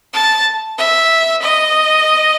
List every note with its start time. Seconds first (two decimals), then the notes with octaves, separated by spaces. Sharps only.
0.14 A5
0.78 E5
1.42 D#5